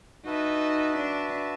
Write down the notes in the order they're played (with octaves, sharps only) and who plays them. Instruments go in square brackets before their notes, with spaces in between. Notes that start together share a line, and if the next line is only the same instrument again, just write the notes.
[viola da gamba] D#4 [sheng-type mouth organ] F#4 B4 E5 A5
[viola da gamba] D4